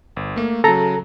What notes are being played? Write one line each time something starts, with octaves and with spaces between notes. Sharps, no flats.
G1
A3 A#3
C#3 F#3 A4 A#5